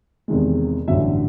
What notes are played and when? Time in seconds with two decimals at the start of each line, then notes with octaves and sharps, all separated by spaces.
0.28 E2 C3 D#3 G#3
0.88 A1 G2 D3 F#3 E5